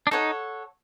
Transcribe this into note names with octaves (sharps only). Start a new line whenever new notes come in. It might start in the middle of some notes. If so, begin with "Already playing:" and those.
D4
D#4 A4 C#5 F#5